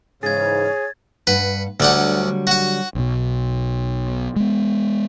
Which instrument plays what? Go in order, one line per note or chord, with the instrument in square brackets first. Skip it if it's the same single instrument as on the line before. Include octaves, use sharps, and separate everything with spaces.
[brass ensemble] G#2 C#3 E3 [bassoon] G#4 [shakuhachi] C#5 [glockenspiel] G#6 A6
[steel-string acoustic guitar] G2 F#5 [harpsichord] B4
[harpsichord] D2 D5 F#5 [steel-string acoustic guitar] D3 F#3 G3
[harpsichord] F#4 F#5
[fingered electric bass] B1 B2
G#3 B3